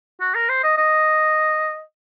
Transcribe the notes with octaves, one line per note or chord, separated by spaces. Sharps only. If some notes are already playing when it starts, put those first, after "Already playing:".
F#4
A#4
C5
D#5
D#5